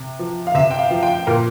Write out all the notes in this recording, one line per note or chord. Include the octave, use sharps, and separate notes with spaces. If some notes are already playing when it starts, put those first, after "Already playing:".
Already playing: C3
F3
F5
C3 E5
G5
F5
F3
G5
A#2 A#4